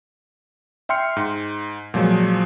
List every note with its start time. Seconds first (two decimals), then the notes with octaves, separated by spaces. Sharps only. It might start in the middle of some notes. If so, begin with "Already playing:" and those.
0.89 E5 G5 C6 F6 C#7
1.16 G#2
1.94 A#2 F3 F#3 G#3